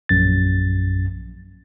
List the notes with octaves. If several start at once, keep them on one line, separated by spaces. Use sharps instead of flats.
A#1 F#2 A6